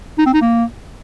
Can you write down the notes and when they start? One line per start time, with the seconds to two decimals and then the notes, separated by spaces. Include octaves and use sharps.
0.19 D#4
0.26 C4
0.34 D#4
0.42 A#3